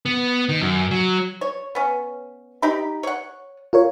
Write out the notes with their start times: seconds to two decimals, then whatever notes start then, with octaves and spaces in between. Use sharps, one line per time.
0.06 B3
0.49 D#3
0.62 F#2
0.91 F#3
1.41 C#5
1.75 B3 C#4
2.62 D#4 G4 B5
3.03 C#5 F#5
3.73 F4 A#4 C#5